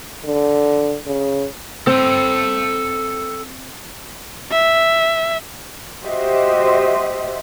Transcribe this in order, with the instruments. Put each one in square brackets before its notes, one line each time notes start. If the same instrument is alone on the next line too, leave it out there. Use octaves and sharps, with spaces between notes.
[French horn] D3
C#3
[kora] C4 [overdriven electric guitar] A4 G5
[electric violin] E5
[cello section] F#4 G4 C5 D#5 E5